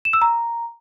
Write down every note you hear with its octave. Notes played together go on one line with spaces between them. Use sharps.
E7
E6
A#5